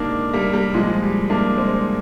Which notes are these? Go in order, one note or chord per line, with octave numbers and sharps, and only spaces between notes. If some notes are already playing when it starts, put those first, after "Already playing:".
Already playing: C3 D#3 G#3 A#3 D4 D#4 G4
G3 A#3
G3 A#3
A#2 F3 G#3
G3
A#3 D4
G#3 C4